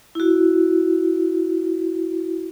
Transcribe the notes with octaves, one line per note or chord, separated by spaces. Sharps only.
E4 F#4